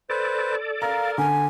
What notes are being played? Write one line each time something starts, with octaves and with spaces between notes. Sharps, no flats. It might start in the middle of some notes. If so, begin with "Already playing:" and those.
A4 B4 C5 D5
A#4 F5 A#5
D3 G#5